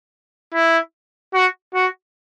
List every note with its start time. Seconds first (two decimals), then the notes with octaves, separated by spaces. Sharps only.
0.54 E4
1.34 F#4
1.74 F#4